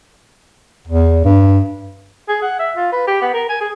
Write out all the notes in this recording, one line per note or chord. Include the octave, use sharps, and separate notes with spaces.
E2
G2
G#4
F#5
E5
F4
B4
G4
B3
A#4
G#5
G#4